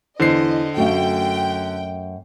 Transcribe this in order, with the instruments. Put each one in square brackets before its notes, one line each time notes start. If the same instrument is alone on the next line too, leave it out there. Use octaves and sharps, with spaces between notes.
[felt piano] E2 [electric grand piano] D3 C5 C7 [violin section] D#5
[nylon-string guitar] F#2 A3 [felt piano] F#4 F5 [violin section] G5